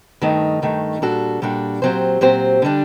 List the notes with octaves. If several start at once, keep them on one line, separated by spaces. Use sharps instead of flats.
G2 D#3 A3 D#4
G2 D#3 A3 D#4
A#2 G3 D4 F#4 A4
A#2 G3 D4 F#4 A4
A#2 F#3 C4 G4 C5
A#2 F#3 C4 G4 C5
D3 G3 D4